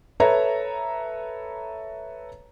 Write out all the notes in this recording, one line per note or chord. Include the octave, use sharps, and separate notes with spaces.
A4 B4 C#5 E5 A#5